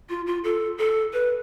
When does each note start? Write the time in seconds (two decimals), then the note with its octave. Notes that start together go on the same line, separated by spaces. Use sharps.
0.09 F4
0.26 F4
0.44 A4
0.78 A4
1.13 B4